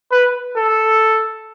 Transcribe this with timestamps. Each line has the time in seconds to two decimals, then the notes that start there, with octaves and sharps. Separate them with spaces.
0.12 B4
0.57 A4